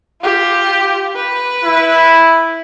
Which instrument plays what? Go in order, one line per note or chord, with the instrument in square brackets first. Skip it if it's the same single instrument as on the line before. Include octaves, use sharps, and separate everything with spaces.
[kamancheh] F4 G4
B4
[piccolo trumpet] E4